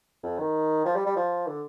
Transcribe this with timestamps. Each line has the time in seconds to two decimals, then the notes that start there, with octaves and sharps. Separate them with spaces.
0.23 F2
0.39 D#3
0.85 F3
0.96 G3
1.06 G3
1.16 F3
1.47 D3